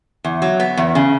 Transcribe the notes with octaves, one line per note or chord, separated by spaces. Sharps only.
E2
F#3
B3
E2
C#3